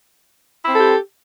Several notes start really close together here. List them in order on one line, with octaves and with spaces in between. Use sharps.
E4 C4 A4 G4